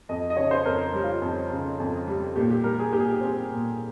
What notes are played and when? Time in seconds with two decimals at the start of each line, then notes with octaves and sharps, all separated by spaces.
0.09 F2 D#5
0.30 D#5
0.37 C#3 C#5
0.51 C5
0.65 F2 A#4
0.93 G3
1.04 F4
1.22 F2
1.51 C#3
1.80 F2
2.08 G3
2.36 A#2 G4
2.50 G4
2.64 G3 A#4
2.79 G#4
2.93 A#2 G4
3.00 G#4
3.08 G4
3.21 C4
3.50 A#2